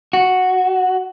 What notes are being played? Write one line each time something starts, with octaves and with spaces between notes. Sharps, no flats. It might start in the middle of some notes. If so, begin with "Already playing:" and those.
F#4